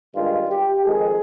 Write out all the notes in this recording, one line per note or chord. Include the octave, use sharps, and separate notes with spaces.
G2 D#3 G#3 F4
G4
F2 D#3 G#3 G#4